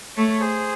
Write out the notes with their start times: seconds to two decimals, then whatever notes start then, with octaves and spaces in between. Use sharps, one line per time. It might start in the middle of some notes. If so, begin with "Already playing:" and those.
0.17 A3 A4 C#5
0.40 G#4 C5